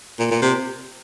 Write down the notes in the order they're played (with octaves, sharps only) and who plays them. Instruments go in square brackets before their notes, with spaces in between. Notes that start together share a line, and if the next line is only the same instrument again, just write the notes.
[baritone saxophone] A#2
A#2
C3